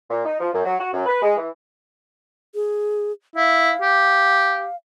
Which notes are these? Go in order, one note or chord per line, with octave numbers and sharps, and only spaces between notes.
A#2
D#4
F3
F#2
F#3
F#4
F#2
B4
G#3
E3
G#4
E4 F5
G4